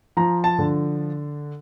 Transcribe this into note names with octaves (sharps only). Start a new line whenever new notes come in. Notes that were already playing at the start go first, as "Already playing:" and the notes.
F3 A#5
A5
D3